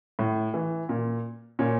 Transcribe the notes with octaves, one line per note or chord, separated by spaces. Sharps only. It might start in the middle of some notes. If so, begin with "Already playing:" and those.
A2
E3
A#2
A#2 C#4